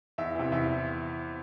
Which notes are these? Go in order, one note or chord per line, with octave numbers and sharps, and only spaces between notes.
E2 E5
C3 E3
E2 E5